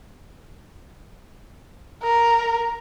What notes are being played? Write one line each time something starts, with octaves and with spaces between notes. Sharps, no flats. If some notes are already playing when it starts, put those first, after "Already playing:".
A#4